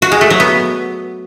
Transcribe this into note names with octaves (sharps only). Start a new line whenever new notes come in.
F#4
G#3
A3
F#3
B3